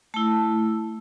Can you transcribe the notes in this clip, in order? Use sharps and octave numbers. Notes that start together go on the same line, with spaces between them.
A3 E4 A5